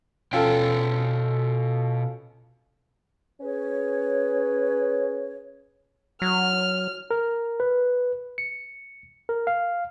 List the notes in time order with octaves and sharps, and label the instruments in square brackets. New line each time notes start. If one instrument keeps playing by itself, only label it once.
[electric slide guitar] B2 G5 G#5 [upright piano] C#4 F4 A4
[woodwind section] C#4 G#4 B4 C#5
[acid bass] F#3 [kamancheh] F6
[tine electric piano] A#4
B4
C#7
A#4
F5